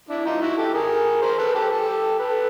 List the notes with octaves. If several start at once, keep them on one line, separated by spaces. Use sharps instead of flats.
D4 E4
D#4 F4
E4 F#4
G4 A4
G#4 A#4
A#4 C5
A4 B4
G4 A4
G4 A4
A4 B4